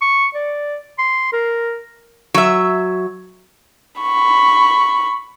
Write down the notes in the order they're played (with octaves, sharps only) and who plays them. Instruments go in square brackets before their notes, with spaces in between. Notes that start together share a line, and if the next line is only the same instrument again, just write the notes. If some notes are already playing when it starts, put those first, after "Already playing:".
[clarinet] C#6
D5
C6
A#4
[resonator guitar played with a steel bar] F#3 E5
[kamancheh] B5 C#6